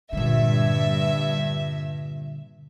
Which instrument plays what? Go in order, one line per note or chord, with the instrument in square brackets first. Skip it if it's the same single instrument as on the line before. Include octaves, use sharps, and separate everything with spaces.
[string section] G2 E5 [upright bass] A#2 D3